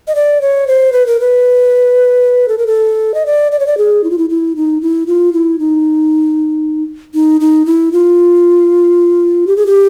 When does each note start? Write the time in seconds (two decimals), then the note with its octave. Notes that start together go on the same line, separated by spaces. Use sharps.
0.08 D#5
0.15 D5
0.41 C#5
0.67 C5
0.93 B4
1.07 A#4
1.20 B4
2.48 A4
2.58 A#4
2.67 A4
3.14 D#5
3.26 D5
3.52 D5
3.59 C#5
3.67 D5
3.78 G#4
4.04 E4
4.10 F4
4.18 E4
4.30 E4
4.56 D#4
4.81 E4
5.07 F4
5.33 E4
5.59 D#4
7.14 D#4
7.41 D#4
7.66 E4
7.92 F4
9.47 G4
9.57 G#4
9.66 G4